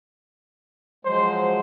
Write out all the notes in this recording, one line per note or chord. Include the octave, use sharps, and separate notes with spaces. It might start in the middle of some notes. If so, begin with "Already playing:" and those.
F3 F#3 G#3 C5